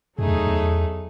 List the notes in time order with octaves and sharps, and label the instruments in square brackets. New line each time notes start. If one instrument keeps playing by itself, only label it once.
[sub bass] F#2 [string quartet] F#3 A3 D#4 G#4
[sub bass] E2
E2